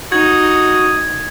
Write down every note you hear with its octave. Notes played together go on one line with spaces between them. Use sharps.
D#4 F#4 D#6 G#6